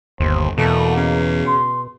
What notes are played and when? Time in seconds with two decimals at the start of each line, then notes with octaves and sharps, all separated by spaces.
0.20 G1 D#2 C5
0.58 E2 B2 A3 A#3
0.96 C#3
1.47 C6